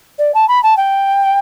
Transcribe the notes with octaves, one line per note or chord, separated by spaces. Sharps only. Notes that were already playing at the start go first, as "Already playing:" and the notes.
D5
A5
B5
A5
G5